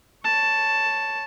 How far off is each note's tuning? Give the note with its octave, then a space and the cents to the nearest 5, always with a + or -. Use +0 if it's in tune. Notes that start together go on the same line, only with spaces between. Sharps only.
C#5 +0 A5 +5